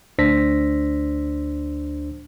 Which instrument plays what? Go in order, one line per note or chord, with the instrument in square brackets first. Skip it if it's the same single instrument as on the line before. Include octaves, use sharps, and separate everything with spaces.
[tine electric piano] D2 D4 C5 E6 A#6 B6